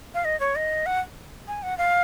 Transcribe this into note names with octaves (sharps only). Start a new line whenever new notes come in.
F5
D#5
C#5
D#5
F#5
G#5
F#5
F5